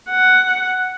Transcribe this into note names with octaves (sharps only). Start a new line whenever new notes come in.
F#5